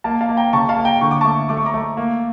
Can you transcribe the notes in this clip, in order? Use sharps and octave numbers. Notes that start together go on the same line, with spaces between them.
A#3 F5 A5
F5 A5
A#3
G5 A#5
C#3 A5 C#6
F5 A5
A#3
G5 A#5
D3 C#6
D6
A3 A5 C#6
A3 D6
C#6
A#5 D6
A3
A#3